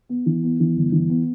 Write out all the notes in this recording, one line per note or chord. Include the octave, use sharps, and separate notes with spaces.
B3
E3
B3
E3
G1
E3
B3